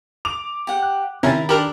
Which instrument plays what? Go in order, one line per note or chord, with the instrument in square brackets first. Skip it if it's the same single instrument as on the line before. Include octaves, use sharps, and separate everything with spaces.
[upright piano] D6 F7
[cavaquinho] G4 F#5
[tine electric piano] F#6
[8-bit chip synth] C3 C#4 [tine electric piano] D#3 B5 A6 [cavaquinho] E4 [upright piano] A#5
[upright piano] D4 F#7 [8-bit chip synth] G4 A#4 [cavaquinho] A4